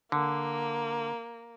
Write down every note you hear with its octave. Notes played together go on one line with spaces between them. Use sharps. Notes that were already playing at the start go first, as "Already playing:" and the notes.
D3 A#3